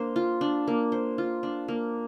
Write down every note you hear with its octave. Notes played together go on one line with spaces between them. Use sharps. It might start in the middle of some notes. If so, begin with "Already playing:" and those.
Already playing: A#3 D4 C5
F4
D4
A#3
C5
F4
D4
A#3